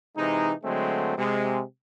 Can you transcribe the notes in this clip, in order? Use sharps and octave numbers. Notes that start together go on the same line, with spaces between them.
C3 E3 G#3 D#4
D3 F#3 G#3 A3 C4
C3 G#3